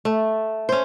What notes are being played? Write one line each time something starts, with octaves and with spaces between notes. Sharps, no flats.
A3
C#4 C5